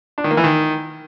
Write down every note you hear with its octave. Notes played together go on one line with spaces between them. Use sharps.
D4
D#3
A#3
E3
D#3